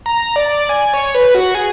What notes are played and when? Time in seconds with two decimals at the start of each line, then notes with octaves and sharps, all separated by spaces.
0.06 A#5
0.36 D5
0.69 G#5
0.94 C#5
1.15 B4
1.35 F#4
1.55 G#4